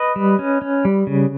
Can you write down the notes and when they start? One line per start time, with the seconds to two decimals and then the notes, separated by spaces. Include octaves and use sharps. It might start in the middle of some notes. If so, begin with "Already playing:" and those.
Already playing: B4 D#5
0.16 G3
0.39 C#4
0.62 C#4
0.85 G3
1.07 C#3